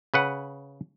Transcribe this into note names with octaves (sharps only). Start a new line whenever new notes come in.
C#3 B4 F#5